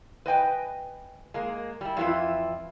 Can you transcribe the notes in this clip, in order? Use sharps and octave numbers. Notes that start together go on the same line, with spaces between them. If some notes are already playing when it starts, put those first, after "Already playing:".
B4 D#5 G5 G#5
G#3 A#3
G3 E4
F2 E3 B3 E4 F4